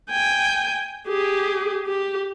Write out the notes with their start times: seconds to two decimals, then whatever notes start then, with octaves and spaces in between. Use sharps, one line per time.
0.10 G5 G#5
1.08 G4 G#4
1.87 G4